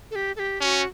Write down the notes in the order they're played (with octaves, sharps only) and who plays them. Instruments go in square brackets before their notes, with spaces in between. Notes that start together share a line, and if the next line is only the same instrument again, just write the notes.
[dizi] A4
G4
A4
G4
[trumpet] C#4 [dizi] G4
[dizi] F#4